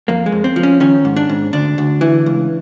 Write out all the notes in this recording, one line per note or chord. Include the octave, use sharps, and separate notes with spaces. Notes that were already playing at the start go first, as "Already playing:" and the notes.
F2 A#3
G#3
F2
C4
F3
C#4
D#3 C#4
G#2
D4
G#2
D2 D4
D2
E3
C#2